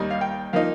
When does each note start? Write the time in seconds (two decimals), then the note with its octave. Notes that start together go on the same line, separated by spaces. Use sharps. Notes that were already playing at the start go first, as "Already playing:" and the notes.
Already playing: D#2 D#3 G3 D#4
0.10 F5
0.21 G5
0.53 F3 A#3 D#4 F5